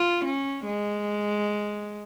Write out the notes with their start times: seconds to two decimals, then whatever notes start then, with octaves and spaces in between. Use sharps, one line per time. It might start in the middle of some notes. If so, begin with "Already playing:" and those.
Already playing: F4
0.24 C#4
0.66 G#3